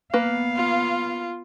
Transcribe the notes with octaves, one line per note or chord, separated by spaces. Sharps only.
A#3 B3 B4 F5
F4